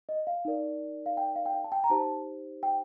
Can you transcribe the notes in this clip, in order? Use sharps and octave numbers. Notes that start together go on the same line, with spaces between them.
D#5
F5
D#4 A#4 D5
F5
G5
F5
G5
F5
A5
G5
A#5
D#4 G4 C5 A5
G5